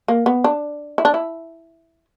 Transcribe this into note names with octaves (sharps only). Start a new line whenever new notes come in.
A#3
B3
D4
E4
D4
E4